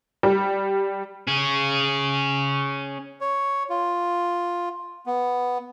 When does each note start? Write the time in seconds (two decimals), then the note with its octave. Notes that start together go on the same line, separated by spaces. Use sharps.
0.23 G3
1.27 C#4 G#4
3.21 C#5
3.70 F4
5.06 B3